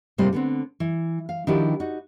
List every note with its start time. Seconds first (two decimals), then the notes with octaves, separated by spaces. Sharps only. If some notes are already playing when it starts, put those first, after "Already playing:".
0.18 G#2 C3 G3 A#3 F4 C5
0.33 D3 B3 C4
0.80 E3
1.29 F5
1.47 D#3 F3 D4 E4 F#4 G4
1.80 D#4 F#4